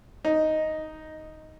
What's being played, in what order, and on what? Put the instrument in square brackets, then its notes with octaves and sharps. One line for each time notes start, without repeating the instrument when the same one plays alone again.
[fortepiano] D#4